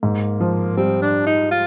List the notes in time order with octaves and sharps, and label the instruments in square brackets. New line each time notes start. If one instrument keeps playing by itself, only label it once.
[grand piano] G#2 [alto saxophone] A#3
[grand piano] F3
[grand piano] G3 [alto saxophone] C4
[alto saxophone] D4
D#4
F4